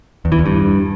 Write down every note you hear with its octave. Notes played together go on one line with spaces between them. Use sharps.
E2
E3
E2
G2